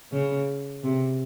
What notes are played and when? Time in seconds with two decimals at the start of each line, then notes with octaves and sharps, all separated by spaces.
0.12 C#3
0.83 C3